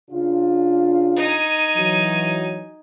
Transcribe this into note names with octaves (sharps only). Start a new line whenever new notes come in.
C#3 D4 F4
D#4 G#5
E3 F#3